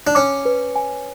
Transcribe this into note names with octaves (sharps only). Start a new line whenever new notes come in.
D4
C#4 D6
B4
G#5